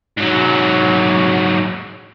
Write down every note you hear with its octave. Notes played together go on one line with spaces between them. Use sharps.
G#2 F#3